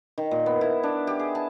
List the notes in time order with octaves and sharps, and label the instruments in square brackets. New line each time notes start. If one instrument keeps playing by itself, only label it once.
[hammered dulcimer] D#3
A#2
B3
E4
D4
G4
G#4
A5